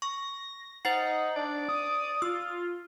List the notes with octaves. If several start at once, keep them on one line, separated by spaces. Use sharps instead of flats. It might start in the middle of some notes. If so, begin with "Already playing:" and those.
C#6 A#6
D#4 C5 F#5 A6 C7
D4 D5
D#6
F4 E6